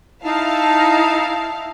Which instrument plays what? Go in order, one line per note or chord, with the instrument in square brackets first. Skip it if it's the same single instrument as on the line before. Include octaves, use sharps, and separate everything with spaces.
[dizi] D#4 [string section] E4 F5 A5